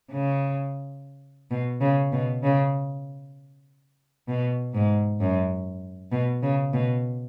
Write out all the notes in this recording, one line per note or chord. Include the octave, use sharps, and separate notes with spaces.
C#3
B2
C#3
B2
C#3
B2
G#2
F#2
B2
C#3
B2